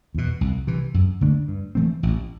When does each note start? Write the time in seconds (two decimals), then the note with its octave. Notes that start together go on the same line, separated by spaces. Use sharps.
0.15 E2 B2
0.41 C2
0.67 C3 E3
0.94 F#2
1.21 D3 A3 D4
1.48 G2
1.75 E3 A3 C4
2.03 A1